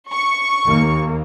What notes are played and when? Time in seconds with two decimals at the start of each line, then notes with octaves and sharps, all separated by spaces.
0.12 C#6
0.67 D#2 A#3